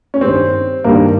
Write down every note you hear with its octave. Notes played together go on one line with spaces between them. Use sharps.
C#4
G2 D#3 G3 C4
G2 D#3 G3 A#3